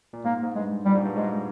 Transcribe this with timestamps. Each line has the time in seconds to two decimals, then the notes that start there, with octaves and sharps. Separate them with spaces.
0.13 A#2
0.24 G#2 A#3
0.43 G#2
0.55 G2 G#3
0.85 A#2 G3
0.95 G#2
1.05 G2
1.15 G#2 G#3